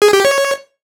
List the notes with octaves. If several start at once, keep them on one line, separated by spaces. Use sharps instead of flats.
G#4
G4
C#5